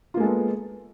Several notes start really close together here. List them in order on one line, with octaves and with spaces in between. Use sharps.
F4 A#3 G#3 A4 B3